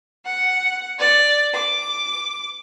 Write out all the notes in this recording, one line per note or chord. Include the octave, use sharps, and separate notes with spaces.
F#5
D5
D6